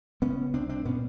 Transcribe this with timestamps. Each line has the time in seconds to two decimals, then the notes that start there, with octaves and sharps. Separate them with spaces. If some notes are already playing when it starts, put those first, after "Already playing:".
0.22 C#3 B3 C#4
0.54 C2 C4 D4
0.69 C4 D4
0.85 A#2 B3 C#4